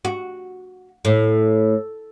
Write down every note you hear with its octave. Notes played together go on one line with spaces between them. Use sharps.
F#4
A2